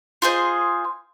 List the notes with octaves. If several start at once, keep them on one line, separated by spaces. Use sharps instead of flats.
F4 G#4 C5 D#5